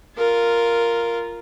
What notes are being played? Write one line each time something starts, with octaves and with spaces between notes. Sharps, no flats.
F4 A#4